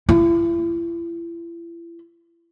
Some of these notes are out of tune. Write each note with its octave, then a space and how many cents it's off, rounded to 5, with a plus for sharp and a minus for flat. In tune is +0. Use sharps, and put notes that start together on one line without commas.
E4 +40